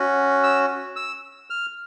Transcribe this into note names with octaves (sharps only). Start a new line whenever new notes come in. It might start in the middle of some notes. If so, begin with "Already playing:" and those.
Already playing: C#4 F#4
E6
E6
F6